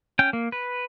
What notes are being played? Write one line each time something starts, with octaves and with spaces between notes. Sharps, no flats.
C#4 G5
A#3
B4